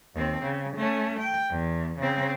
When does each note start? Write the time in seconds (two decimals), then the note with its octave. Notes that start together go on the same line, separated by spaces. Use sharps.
0.15 D#2 C4
0.44 C#3
0.77 A3 C#4
1.20 G5
1.51 E2
2.00 C#3 C4